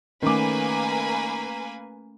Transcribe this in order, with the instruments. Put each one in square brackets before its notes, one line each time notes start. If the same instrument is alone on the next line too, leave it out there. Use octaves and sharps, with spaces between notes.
[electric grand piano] D#3 D6 [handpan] A3 C#4 [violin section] A#3 B4 G#5